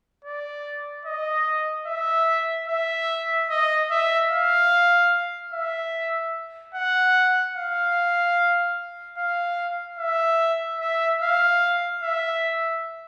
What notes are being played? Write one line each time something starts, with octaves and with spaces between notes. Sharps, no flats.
D5
D#5
E5
E5
D#5
E5
F5
E5
F#5
F5
F5
E5
E5
F5
E5